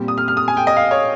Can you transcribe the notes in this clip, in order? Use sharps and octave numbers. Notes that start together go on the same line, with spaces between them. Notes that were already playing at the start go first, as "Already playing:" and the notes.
Already playing: A#2 G3 C4
D#6
F6
F6
D#6
G#5
G5
D#5
F5
C#5